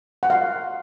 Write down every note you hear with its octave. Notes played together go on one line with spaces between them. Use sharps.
F#5
F5